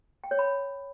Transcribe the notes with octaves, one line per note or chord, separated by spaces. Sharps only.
G5
C#5
B5